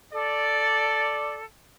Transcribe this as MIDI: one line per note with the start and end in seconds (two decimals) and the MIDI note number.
0.13 1.45 69
0.13 1.35 74